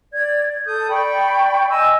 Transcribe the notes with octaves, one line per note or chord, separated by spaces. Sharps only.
D5 G#6
A4 D#6 G6
D5 G5 B5 C#6
D#5 G#5 E6